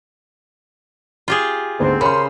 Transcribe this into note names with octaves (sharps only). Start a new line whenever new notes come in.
F4 G4 G#4
D2 G#2 B3 C4 C5
C#3 C#4 A#4 C5 B5 C6